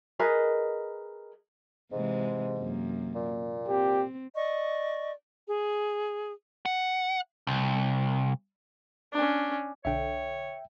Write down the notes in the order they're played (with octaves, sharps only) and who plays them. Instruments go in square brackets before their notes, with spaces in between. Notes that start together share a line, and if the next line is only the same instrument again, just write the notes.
[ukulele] G#4 A#4 B4 D#5
[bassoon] G#2 [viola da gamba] C3 E3 G#3
[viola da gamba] F#2 A#3
[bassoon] A#2
[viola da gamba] C4 [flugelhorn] G4
[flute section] D5 D#5 C#6
G#4
[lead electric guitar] F#5
C2
[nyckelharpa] C#4 D4
[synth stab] B1 D3 [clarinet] C#5 [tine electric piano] E5 G5